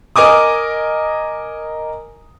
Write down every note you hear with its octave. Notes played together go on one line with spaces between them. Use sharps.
A#4 D#5 G#5 D6 D#6